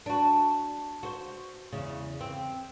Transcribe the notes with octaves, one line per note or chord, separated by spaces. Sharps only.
D4 F#4
F#4 C5
E2 C#3
C4